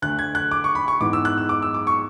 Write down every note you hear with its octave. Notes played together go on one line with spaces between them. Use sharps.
D2 D3 A3 F#6
G#6
F#6
D6
C#6
B5
C#6
G#2 E3 B3 D6
E6
F#6
E6
D6
E6
D6
C#6